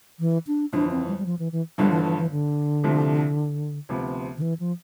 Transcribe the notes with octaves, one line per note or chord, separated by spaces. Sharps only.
E3
D4
G1 F2 E3 D4
C4
G3
G3
F3
E3
E3
G1 G2 D3 F3 G3
E3
E3
E3
D3
C2 C3 F3 A3
D2 C3 F3 B3
D3
E3
F3